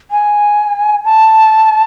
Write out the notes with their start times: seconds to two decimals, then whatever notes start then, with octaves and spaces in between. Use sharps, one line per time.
0.11 G#5
1.05 A5